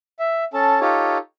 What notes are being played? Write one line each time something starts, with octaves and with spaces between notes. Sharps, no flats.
E5
C#4 A4 A5
D#4 F4 G4 A4 C#5